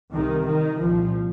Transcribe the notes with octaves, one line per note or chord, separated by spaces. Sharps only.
C2 C3 D#3
D#3
C2 A#2 F3